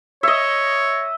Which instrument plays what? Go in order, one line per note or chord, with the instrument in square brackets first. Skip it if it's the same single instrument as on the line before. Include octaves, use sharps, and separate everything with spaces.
[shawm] C#5 [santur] D#5 E5